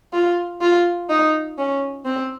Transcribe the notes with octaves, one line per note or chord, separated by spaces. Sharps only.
F4
F4
D#4
C#4
C4